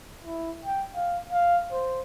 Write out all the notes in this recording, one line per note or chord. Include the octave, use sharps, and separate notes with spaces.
E4
G5
F5
F5
C5